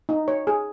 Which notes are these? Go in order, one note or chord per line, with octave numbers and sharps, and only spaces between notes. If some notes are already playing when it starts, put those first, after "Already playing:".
D#4
C#5
G#4